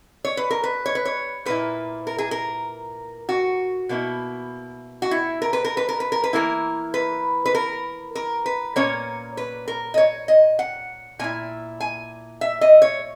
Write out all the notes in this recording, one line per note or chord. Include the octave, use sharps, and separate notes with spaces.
C#5
B4
A#4
B4
C#5
B4
C#5
A#2 A#3 E4 B4
A#4
G#4
A#4
F#4
B2 A#3 C#4 E4
F#4
E4
A#4
B4
A#4
B4
A#4
B4
A#4
B4
E3 A#3 E4 A#4
B4
B4
A#4
A#4
B4
A#2 A#3 C#4 C#5
B4
A#4
D#5
C#5
D#5
F#5
A#2 A#3 E4 G#5
G#5
E5
D#5
C#5